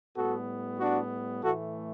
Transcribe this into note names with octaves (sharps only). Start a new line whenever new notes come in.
A2 G3 B3 F#4 A4
D4 F#4
A2 E3 A3 F#4 A4